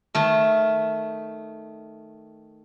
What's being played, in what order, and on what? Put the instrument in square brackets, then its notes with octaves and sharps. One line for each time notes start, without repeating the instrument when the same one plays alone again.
[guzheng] D#3 A3